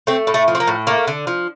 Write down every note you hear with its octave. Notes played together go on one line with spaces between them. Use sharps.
A3 C4
A2
A3
F3
C4
A#3
A2
A3 A#3
D3
F3